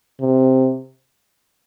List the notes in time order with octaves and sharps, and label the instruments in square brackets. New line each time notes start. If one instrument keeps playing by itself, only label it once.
[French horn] C3